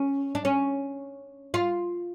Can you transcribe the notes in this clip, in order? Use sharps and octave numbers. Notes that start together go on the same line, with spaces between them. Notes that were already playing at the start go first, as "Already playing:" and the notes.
Already playing: C#4
D4
C#4
F4